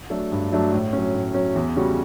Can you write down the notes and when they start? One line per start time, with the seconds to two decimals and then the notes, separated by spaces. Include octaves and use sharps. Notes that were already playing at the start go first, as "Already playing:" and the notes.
0.10 F#3 A3 D4 A4
0.32 G2
0.52 F#3 A3 D4 A4
0.72 A2
0.93 F#3 C#4
1.14 A2
1.34 F#3 C#4
1.55 E2
1.76 C#3 G3 C#4 F#4